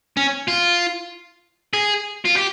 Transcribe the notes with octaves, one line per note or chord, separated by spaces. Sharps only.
C#4
F4
G#4
F4
G4